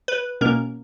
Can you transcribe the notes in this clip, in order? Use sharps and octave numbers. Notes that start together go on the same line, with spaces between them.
B4
B2 A#3 C#4 A#4